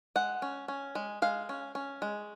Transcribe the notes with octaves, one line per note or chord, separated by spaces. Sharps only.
G#3 F#5
C#4
C#4
G#3
G#3 F5
C#4
C#4
G#3